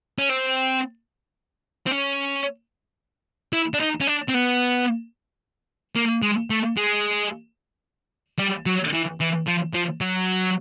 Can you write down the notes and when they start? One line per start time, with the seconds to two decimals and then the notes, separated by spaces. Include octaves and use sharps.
0.18 C#4
0.29 C4
1.86 C4
1.91 C#4
3.53 E4
3.74 D4
3.80 D#4
4.00 C#4
4.07 D4
4.28 C4
4.34 B3
5.96 A#3
6.22 G#3
6.50 A3
6.77 G#3
8.39 G3
8.66 F#3
8.93 E3
9.20 E3
9.47 F3
9.74 F3
10.01 F#3